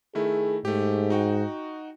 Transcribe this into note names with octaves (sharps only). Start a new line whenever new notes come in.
D#3 A3 E4 G#4
G#2 A3 G4
D#4 F#4 G5